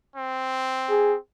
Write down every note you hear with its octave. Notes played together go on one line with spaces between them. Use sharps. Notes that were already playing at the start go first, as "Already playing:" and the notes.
C4
G#4